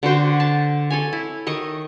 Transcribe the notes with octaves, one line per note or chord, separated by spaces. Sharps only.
D3 F#4 C5 G5
A5
A4 C#5 G#5
E4
D#3 D#5 C#6